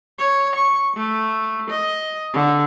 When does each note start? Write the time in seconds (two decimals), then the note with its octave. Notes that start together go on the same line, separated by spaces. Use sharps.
0.19 C#5
0.55 C#6
0.97 A3
1.70 D#5
2.34 D3